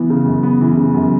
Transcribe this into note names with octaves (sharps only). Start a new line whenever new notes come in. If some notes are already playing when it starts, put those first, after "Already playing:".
Already playing: E3 B3
C#3
F#2
B3
E3
C#3
F#2